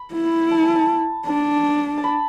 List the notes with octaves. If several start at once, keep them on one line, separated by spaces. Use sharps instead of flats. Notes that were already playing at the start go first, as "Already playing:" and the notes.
Already playing: B5
E4
A5
G#5
A5
D4 A5
A5
B5